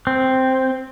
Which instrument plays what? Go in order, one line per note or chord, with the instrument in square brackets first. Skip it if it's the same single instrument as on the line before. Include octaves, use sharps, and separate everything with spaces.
[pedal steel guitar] C4